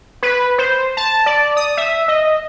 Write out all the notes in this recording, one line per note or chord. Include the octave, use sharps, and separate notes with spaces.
B4
C5
A5
D5
D#6
E5
D#5